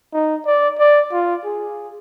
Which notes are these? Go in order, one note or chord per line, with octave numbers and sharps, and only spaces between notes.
D#4
D5
D5
F4
G#4